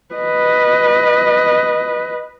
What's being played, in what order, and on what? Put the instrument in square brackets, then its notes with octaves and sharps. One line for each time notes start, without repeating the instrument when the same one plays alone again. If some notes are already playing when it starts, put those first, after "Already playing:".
[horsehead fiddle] B4 D#5